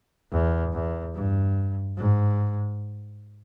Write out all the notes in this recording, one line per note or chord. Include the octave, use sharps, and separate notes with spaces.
E2
E2
G2
G#2